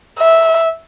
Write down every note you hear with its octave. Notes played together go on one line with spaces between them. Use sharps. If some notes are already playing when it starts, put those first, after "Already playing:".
E5